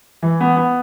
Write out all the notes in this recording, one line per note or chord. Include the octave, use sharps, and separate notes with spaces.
E3
B3
B3